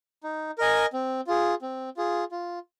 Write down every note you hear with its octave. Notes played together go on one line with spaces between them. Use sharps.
D#4
A#4 D#5 G#5
C4
F4 G#4
C4
F4 G#4
F4